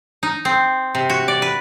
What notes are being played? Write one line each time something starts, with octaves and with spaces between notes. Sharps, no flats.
D#4
C4
C3
F#4
D5
B4